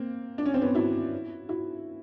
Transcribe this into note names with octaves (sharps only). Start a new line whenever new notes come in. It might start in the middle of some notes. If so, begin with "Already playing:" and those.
Already playing: A#3 C4
D4
C#4
C4
B3 C#4
E4 F#4
E4 F#4